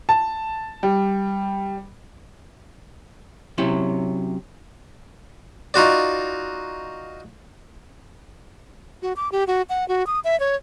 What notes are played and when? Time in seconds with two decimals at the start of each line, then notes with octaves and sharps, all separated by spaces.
0.09 A5
0.83 G3
3.58 C3 F#3 C#4 E4
5.74 D#4 F4 F#4 D5
9.02 F#4
9.16 D6
9.32 G4
9.47 F#4
9.69 F#5
9.88 F#4
10.07 D#6
10.24 E5
10.40 C#5